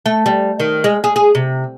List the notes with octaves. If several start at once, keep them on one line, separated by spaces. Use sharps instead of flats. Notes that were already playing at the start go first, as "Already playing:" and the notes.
A3
G3
D#3
G#3
G#4
G#4
C3